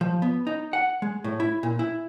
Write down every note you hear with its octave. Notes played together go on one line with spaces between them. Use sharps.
F3
B3
D#4
F#5
G#3
A2
E4
A#2
E4